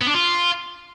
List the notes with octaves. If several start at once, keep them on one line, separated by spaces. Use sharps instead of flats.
B3
D4
F4